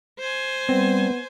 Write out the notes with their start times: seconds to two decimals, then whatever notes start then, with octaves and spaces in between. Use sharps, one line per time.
0.19 C5 G#5
0.69 G3 B3 C4